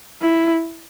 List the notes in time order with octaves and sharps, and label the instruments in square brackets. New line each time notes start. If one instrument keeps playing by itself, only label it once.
[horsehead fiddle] E4